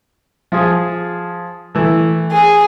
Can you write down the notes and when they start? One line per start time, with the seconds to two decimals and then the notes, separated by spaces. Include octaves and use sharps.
0.52 F3 G#4
1.75 E3 A3
2.32 G#4